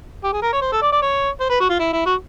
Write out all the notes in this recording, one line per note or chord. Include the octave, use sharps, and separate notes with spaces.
G4
G#4
A#4
C#5
C5
A4
D5
D5
C#5
C5
B4
F#4
F4
E4
E4
F#4